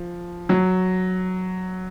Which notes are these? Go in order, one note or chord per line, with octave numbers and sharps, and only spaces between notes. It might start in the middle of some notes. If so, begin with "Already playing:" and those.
Already playing: F3
F#3